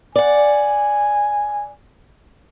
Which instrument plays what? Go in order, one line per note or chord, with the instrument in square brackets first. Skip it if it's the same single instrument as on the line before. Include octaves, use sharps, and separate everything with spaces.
[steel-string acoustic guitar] D5 F#5 [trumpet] G#5